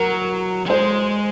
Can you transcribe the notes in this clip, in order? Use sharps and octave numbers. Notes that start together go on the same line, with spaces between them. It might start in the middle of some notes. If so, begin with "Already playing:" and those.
Already playing: F#3 A#4
F#3
G#3 C5